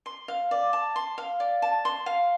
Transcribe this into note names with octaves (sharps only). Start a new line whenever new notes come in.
C6
F5
D5
A5
C6
F5
D5
A5
C6
F5